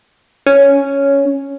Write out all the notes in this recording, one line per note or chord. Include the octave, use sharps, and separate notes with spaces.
C#4